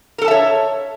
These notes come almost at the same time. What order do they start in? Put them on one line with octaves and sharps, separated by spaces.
A#4 A4 A5 E5 C#5